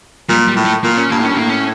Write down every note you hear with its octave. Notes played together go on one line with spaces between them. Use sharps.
A#2 G3
G3
A2
A3
A#2 A#3
C#4
G2 A#3
A2
C#4
G2
A2 A#3
C#4